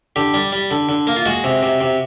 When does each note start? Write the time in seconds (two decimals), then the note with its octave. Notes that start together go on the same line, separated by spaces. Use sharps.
0.16 D3 G4
0.34 G3
0.52 G3
0.71 D3
0.89 D3
1.07 A#3
1.17 F4
1.26 G#3 F#4
1.44 C3
1.63 C3
1.81 C3